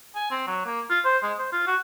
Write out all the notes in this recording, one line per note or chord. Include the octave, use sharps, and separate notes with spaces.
G#5
C4
F#3
A#3
F4
C5
G#3
C5
F4
F#4